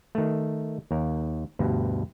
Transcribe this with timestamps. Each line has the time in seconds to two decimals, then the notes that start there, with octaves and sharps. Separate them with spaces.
0.15 D#3 A3
0.91 D#2 A#4
1.59 D2 G2 B2